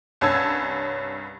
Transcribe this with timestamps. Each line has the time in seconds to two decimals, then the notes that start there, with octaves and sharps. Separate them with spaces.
0.21 C2 G2 C#4 A5 E6 G#6